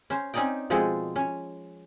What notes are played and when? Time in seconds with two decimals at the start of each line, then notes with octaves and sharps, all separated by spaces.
0.10 C#4 C5
0.34 C4 C#4 D#4 D5 D#5 G5
0.70 B2 F3 G#3 C4 G#4 A4
1.16 C#4